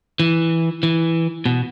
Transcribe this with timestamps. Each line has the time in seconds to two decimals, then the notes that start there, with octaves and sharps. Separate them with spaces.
0.20 E3
0.83 E3
1.46 B2